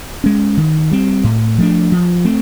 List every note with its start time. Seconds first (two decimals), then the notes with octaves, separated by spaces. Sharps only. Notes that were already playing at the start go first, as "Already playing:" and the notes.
0.24 G#3 C#4
0.57 D#3
0.91 G3 C4
1.24 A2
1.58 F3 A3 D4
1.92 F3
2.25 A3 C4